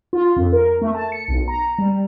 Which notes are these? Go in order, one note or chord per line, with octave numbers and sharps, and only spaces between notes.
F4
F2
A#4
A3
A5
C#7
B1
A#5
G3